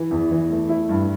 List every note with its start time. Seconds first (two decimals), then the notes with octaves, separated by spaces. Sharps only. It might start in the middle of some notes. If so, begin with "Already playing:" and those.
Already playing: E3
0.11 E2
0.31 E3
0.50 A3
0.69 E4
0.89 G2